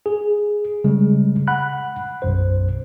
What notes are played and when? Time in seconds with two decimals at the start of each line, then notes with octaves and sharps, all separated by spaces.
0.06 G#4
0.84 C#3 G3 G#3
1.48 F#5 B5 F#6
2.22 B1 F#2 C5